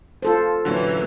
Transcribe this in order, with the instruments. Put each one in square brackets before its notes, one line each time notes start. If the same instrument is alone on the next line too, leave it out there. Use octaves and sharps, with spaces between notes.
[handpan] F4 A4 C5
[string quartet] A#2 E3 [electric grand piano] D3 F#3 C#4